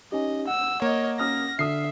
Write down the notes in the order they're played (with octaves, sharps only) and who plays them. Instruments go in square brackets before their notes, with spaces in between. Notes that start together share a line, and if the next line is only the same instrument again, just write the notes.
[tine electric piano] C#4 D#4 G4 [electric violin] D#5
[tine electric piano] F#5 [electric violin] E6
[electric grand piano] A#3 [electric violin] C#5 D#5
[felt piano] C#4 D#6 F6 [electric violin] A#6
[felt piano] D3 D#6 [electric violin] E5 [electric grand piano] C7